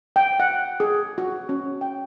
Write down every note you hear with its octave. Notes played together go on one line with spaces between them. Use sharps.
G5
F#5
G#4
F#4
C#4
G5